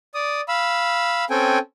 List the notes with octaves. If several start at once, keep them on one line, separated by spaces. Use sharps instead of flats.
D5 D#6
F5 B5 E6
C4 C#4 A4 G5 G#5